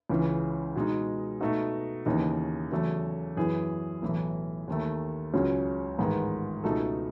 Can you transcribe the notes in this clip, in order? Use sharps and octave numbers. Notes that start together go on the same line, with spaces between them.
C#2 C#3 E3
B2 G#3 D#4
B2 A3 D#4 F#4
D#2 C#3 E3 B3 D#4
E2 C#3 F#3 A3
F#2 E3 B3 E4 G#4
B1 A2 E3 A3 E4
D#2 D#3 A3
C#2 C#3 F#3 C#4 F#4
A1 G#2 D#3 G#3 B3
C#2 B2 A3 D#4 A4